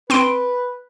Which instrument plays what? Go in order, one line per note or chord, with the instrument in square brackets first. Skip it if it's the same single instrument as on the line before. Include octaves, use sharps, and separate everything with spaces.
[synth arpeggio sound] C4 C6 D7 [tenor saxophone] B4